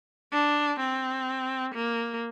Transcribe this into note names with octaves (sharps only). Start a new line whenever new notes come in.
D4
C4
A#3